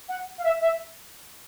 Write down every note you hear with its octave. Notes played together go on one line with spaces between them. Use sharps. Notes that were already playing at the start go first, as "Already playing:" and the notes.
F#5
F5
E5
E5